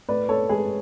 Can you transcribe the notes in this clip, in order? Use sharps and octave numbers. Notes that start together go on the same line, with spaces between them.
A2 B4 D5
A4 C#5
G#3 G#4 B4